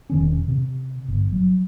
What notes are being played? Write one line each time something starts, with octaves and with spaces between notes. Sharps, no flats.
E1 D#3 C#4
C3
G1
F#3